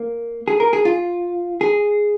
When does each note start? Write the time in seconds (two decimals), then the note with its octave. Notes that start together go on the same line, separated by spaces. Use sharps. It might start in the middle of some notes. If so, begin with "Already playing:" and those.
Already playing: A#3
0.48 G#4
0.60 A#4
0.73 G#4
0.85 F4
1.61 G#4